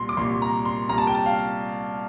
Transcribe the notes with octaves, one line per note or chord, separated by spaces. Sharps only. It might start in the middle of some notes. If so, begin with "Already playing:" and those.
Already playing: C2 A#2 C6
D6
C2 A#2 C6
A#5
C6
C2 A#2 A#5
A5
G5
A5
F5